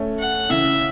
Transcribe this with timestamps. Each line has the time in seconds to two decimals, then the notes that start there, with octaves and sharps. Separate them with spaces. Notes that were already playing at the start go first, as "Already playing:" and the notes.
Already playing: A3 C#4
0.19 F#5
0.50 C#3 E3 E5